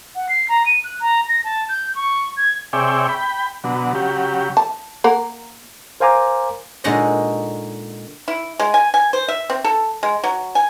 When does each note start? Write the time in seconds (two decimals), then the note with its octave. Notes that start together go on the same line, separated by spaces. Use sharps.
0.15 F#5
0.29 C7
0.49 A#5
0.66 D#7
0.84 F#6
1.00 A#5
1.29 A#6
1.44 A5
1.69 G6
1.95 C#6
2.37 G#6
2.73 C3 G#4 C#5 D5 E5 G5
3.08 G5 B5
3.64 B2 D3 F#3
3.95 C#3 F#3 G4
4.57 A5
5.04 A#3 A#4 F#5
6.00 A#4 C5 F5 G#5 A#5 D6
6.84 A#2 D3 G#3 D#4 C#5 D#5
8.28 E4
8.59 G#3
8.74 G#5
8.94 G#5
9.13 C5
9.28 E5
9.50 C4
9.64 A4
10.03 G#3
10.24 F#3
10.55 G#5